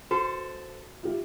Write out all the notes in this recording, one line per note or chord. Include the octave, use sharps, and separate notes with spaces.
F#4 A4 B4 C5
F4 G4 E5